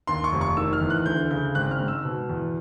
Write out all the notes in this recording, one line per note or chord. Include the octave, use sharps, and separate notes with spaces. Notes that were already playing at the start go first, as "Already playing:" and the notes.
D#2 C6
C#6
F1
C#6
D#3 E6
F6
E2
F#6
D2 G6
C#3 G6
G#1 F#6
F6
G#2
E6
B2
E2